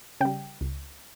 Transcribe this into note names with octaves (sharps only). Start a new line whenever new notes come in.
C#3 G3 G5
C#2